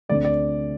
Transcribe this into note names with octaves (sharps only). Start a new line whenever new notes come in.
D2 D3 A3 C4 D5
D5